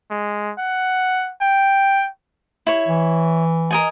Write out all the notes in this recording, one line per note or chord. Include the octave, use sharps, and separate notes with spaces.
G#3
F#5
G5
E4 C#5
E3
A#4 D#5 G#5